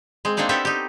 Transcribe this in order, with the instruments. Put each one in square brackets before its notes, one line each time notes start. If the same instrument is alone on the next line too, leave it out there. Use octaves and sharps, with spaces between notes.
[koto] G#3 C4
A#3 C4 D4 D#4 D5
B3 C4 G4 A4 E5 F#5
D#4 G4